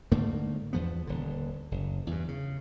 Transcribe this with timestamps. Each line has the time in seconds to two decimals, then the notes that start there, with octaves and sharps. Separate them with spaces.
0.12 G#2 D3 A3 A#3
0.73 E2 F3 B3
1.07 D#1 D3
1.71 F#1
2.07 E2 G2
2.28 C#3